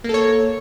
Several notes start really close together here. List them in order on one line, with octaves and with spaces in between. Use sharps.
A#3 A4 C#5